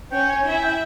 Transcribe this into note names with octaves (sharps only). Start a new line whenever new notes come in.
C#4 C#5 G5
G#5
E4 E5
G#5
G5